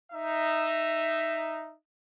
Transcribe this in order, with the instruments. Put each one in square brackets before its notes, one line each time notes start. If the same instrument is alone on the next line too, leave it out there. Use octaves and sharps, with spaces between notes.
[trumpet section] D#4 E5